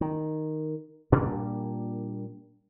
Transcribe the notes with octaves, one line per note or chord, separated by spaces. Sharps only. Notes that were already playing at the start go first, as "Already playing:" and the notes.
D#3
A#2 G3 A#3 D4